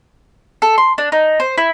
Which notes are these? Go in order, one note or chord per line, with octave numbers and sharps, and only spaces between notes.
A4
C6
D4
D#4
C5
E4